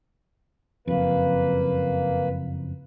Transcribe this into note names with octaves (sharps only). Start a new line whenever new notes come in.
F#1 F2 A#3 B4